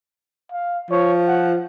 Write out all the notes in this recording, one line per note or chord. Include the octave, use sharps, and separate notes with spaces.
F5
F3 C#5
F#5